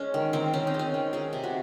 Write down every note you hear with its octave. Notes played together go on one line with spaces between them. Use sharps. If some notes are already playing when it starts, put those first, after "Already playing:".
Already playing: G#3 C#4
D#3
D#3 C4
C4 C#4
D#4
G#3
C#4
D#3
D#3 G#4
C3
F#4